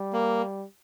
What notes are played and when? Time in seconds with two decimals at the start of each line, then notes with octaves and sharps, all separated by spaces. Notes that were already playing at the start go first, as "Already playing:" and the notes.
Already playing: G3
0.13 A#3